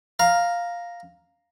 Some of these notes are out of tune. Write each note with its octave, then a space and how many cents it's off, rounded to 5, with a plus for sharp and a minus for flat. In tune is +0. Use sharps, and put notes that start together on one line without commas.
F5 +0 A#5 +0